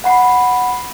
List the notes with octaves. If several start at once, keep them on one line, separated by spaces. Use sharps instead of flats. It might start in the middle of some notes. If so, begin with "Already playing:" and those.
F#5 B5 C7